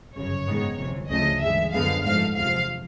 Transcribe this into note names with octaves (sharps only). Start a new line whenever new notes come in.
G1 F#2 C#3 C#5
G#2 D#3 G#3 B3
G1 F2 C3 E3
D2 C#3 F3 A3 D#5
G2 E3 G#3 E5
F#2 D3 F3 G#3 B3 F5
G#2 F3 A3 F5
E2 C3 F3 F5